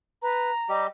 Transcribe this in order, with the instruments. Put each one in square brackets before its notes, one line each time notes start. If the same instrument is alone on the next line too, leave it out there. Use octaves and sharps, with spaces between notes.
[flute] B4 [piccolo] A#5
[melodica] G3 G4 [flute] D#5